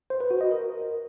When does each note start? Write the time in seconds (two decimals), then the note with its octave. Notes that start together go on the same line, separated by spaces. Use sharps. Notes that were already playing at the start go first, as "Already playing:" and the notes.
0.10 C5
0.20 B4
0.31 F#4
0.41 D#5
0.51 A#4